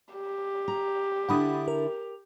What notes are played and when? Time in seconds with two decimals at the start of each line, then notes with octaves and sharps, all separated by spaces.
0.14 G4
0.68 A#5
1.29 D3 D4 E4 F#5 B5 D#6
1.68 A#4